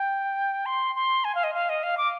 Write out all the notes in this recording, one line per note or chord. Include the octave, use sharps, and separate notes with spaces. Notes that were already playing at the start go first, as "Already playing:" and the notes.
Already playing: G5
C6
C6
G#5
F5
D#5
F5
D#5
F5
D6